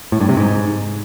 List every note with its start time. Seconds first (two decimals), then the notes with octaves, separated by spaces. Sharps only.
0.12 A2
0.21 G2
0.29 C3
0.37 G#2